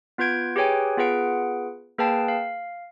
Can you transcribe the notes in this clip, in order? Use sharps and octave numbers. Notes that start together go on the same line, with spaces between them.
B3 F4 B4 G6 G#6 D7
G4 G#4 B4 C#5 G5 G#5
B3 F4 G#4 B4 F#5 D7
A#3 G#4 B4 F5 G5 A5
F5